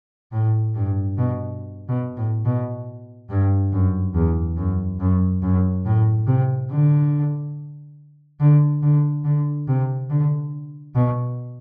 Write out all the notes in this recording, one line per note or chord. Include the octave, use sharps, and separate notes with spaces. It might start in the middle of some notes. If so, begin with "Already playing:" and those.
A2
G2
B2
B2
A2
B2
G2
F#2
E2
F#2
F#2
F#2
A2
C3
D3
D3
D3
D3
C3
D3
B2